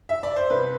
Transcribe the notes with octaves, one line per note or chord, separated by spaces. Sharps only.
E5
D5
C5
C2 B4